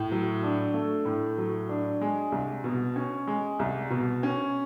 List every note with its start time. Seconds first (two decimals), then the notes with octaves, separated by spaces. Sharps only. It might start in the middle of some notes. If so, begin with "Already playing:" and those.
Already playing: A2
0.12 F#3
0.43 D4
0.74 A3
1.05 A2
1.38 F#3
1.69 D4
2.01 G#3
2.32 C2
2.64 B2
2.96 C#4
3.27 G#3
3.59 C2
3.90 B2
4.23 C#4